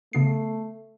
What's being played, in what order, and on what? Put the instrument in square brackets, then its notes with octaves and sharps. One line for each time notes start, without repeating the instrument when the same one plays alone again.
[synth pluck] C#3 B3 C7 [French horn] A3